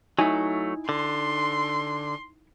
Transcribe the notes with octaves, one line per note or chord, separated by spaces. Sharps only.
F#3 A3 D#4 E4 G#5
D3 C6